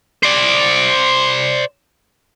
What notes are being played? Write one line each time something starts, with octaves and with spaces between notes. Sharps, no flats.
C5 D5